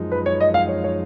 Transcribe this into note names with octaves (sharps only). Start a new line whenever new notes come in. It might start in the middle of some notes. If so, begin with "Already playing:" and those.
Already playing: F#2 F3 G#3 D#4
B4
C#5
D#5
F5
C#5
C#5